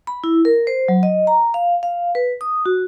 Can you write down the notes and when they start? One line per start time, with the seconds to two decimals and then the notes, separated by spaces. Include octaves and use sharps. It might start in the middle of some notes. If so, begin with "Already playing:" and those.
0.07 B5
0.24 E4
0.45 A#4
0.67 C5
0.88 F#3
1.03 D#5
1.27 A#5
1.54 F5
1.83 F5
2.15 B4
2.41 D#6
2.66 F#4